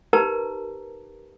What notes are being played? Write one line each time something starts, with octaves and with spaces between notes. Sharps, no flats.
D#4 G4 A#4 B4 A5 A#5